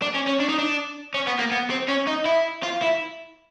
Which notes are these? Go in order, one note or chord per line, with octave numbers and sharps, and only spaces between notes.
D4
C#4
C#4
D4
D#4
D4
C#4
B3
A#3
B3
C4
C#4
D#4
E4
F4
E4